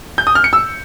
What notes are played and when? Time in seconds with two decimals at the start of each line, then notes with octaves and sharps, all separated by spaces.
0.18 G6
0.27 D#6
0.35 F6
0.44 C#7
0.53 E6